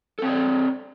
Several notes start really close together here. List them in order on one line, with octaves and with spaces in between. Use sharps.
A4 C4 C#5 D5